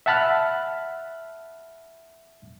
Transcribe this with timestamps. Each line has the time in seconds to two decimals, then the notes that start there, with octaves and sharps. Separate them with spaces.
0.06 E5 F#5 A5 B5 F6 F#6